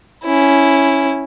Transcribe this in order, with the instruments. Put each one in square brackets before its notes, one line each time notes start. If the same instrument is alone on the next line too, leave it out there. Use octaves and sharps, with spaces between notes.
[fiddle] C#4 E4